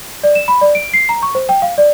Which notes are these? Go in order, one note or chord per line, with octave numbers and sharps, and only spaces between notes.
D5
E7
B5
D5
D7
C7
A#5
C#6
C5
G5
F5
D5